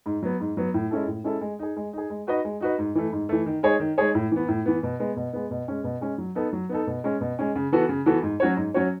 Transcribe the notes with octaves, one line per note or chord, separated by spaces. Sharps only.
G#2
F#3 B3
G#2
F#3 B3
A2
G#3 C#4 E4 A4
A2
G#3 C#4 E4 A4
G#3
D#4 G#4
G#3
D#4 G#4
G#3
D#4 F#4 B4 D#5
G#3
D#4 F#4 B4 D#5
G#2
E3 A3
G#2
E3 A3
D#3
G#3 D#4 G#4 C#5
D#3
G#3 D#4 G#4 C#5
A2
E3 B3
A2
E3 B3
B2
G#3 B3
B2
G#3 B3
B2
G#3 C#4
B2
G#3 C#4
F#3
B3 D#4 A4
F#3
B3 D#4 A4
B2
G#3 C#4
B2
G#3 C#4
C#3
E3 B3 F#4 A4
C#3
E3 B3 F#4 A4
G#2
F#3 C#4 F#4 C#5
G#2
F#3 C#4 F#4 C#5